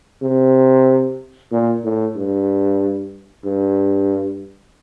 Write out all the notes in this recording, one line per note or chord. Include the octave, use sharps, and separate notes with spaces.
C3
A#2
A2
G2
G2